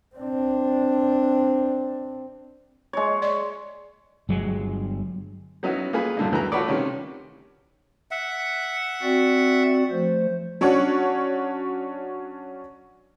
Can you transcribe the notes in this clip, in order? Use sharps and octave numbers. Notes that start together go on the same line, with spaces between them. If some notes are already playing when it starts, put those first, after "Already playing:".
C4 D4
G#3 C#5
D5
G1 F#3 G#3
F#3 B3 C#4 D#4 E4 F#4
A#3 B3 F4 G#4 B4
F#2 A2 D3 G#3 A#3
D2 E3 B3 A#5
A3 F4 F#4 B4 C#5 D5
C3 D#3 C#4
E5 F#5
C4 F#4 D5
F3 A3 C5
F#3 C#4 D4 C#5 F#5